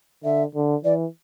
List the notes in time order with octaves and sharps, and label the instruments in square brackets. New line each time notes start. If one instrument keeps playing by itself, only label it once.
[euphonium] D3 [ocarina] E5
[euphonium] D3
[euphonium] E3 [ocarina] D5